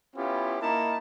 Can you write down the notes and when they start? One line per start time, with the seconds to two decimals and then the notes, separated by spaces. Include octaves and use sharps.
0.16 B3 C#4 E4 F4 G4
0.61 A#3 D#4 E4 A#4 A5